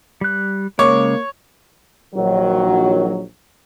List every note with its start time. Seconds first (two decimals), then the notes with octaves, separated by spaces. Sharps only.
0.21 G3 F#6
0.79 C#3 G#3 A#3 C#5 D6
2.15 A#1 D#3 F#3